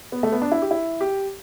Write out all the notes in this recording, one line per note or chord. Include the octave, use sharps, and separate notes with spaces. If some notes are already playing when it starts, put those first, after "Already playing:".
B3
A3
B3
D4
E4
G4
E4
G4